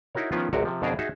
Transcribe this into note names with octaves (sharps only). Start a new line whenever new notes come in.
D#4 E4 F#4 A#4 C#5
D#3 F3 B3 C#4 F4
G#1 C#2 C3 F#4 A#4
C3 F3
F2 B2 D4 G#4 A#4 C5
D#4 F#4 G#4 E5